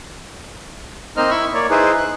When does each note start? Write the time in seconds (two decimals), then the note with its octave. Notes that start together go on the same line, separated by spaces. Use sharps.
1.17 A#3 C4 D#4 C5 D#5 F6
1.30 E4 B5 C#6 E6
1.54 A#3 C#5 D5
1.70 D#4 E4 G#4 B4 C5
1.98 F#6